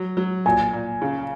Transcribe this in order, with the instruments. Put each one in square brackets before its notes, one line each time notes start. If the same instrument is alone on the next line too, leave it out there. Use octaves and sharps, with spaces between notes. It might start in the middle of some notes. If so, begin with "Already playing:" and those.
Already playing: [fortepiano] F#3
F#3
[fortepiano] A#2 [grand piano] G#5
[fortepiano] A#2
C#3